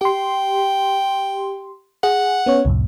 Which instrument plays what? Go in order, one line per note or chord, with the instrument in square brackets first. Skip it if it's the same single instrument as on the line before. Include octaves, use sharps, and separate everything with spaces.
[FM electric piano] G4 C6 [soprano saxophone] G5
[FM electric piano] G#4 [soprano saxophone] F#5
[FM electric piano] B3 C#4 C#5
C2 F2 A2